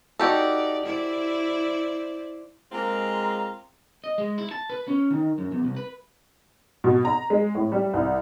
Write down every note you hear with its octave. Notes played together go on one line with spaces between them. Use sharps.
D#4 F#4 G4 A4 D5
E4 C5 D5
G#3 A#3 C4 F4 A#5
D#5
G#3
E4
A5
B4
C#4
D#3
F#2
E2
C2
B4
B2
A#5
G#3
A2
G3
C2